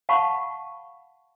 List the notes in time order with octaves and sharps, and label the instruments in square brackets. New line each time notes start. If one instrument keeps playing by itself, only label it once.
[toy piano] F5 F#5 A5 B5 C#6